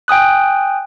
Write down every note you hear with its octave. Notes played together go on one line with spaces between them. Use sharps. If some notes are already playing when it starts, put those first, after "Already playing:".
G5 G#5 D#6 F#6